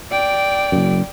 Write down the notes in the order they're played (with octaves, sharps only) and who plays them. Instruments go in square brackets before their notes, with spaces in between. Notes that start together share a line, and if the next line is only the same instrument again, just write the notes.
[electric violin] D5 G5
[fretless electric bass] F#1 F#2